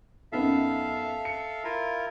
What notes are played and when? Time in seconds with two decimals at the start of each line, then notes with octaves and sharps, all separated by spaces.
0.32 F#2 B3 D#4 A4 E5 F5
1.25 C#7
1.64 E4 F4 A#4